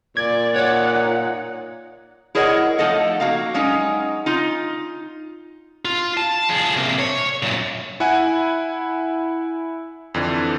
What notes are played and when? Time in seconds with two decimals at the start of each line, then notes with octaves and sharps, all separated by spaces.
0.17 A#2 D5 G#6
0.56 D#4 C#5 D5 F#5
2.35 E4 G#4 A#4 C#5 D#5 F#5
2.78 F3 A3 D#4 A4 D#5 F#5
3.20 A#3 F#4 F5 A#5
3.54 F#3 G#3 C#4 D#4
4.26 D#4 F4
5.85 F4
6.17 A5
6.49 F3 G#4
6.76 C3 A#3
6.99 C#5
7.43 F#2 A#2
8.00 E4 F#5 G#5
10.14 F2 D3 E3